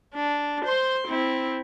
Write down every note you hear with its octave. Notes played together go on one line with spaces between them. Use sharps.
D4
C5 C6
C4 E4